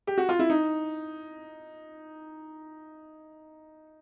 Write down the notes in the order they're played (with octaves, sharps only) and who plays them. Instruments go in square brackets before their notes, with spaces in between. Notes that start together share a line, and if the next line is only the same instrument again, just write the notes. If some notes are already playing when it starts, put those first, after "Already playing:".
[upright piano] G4
F#4
F4
E4
D#4